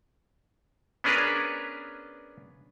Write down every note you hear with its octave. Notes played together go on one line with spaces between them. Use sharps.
B3 C#4 D4 G#4 A#4 B4